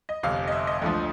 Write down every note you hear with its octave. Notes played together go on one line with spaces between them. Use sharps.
D#5
G1 F2 C3 F5
D#5
E5
D#5
D2 D3 F3